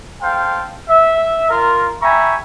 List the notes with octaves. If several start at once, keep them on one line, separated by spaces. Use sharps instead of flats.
A4 C5 F5 G5
E5
F4 A#4
E5 G5 G#5 A#5 B5 C#6